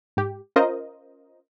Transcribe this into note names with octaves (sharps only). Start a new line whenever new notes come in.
G#2 G4
C#4 F4 A#4 C5 D#5